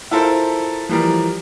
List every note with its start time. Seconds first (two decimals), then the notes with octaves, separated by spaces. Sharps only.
0.11 E4 F4 A4 A#4 C5
0.89 E3 F3 G3 A#4